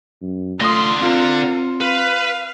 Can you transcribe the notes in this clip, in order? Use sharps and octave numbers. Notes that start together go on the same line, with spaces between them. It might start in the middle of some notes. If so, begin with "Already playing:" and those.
F#2
D3 A3 F4 C6 D#6 A#6
C4 F4 A#4
B4 F5